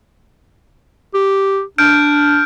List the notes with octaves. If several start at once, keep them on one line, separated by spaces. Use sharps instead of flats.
G4
D4 F6 G6 D7